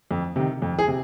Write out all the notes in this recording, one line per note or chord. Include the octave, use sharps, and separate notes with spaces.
F2
C3 D#3
F2
G#4
C3